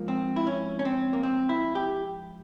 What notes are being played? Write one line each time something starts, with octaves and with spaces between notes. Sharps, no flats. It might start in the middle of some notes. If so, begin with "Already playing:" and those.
Already playing: G#2 F3 A#3
C4
E4
C#4
C#4
C4
A#3
C4
E4
G4